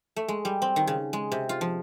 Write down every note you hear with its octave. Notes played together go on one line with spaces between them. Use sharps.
A3
G#3
G3
C4
D#3
C#3
G#3
C3
F4
F3